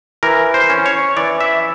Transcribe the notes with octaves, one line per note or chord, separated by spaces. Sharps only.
E3 A#4
C5
C#4
C#5
E3 D5
E5